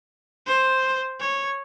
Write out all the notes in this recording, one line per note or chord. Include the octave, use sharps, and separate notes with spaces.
C5
C#5